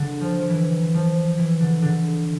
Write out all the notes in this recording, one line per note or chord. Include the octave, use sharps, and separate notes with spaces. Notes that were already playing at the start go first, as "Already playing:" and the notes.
Already playing: D3
F3
F3
E3
F3
E3
D3
D3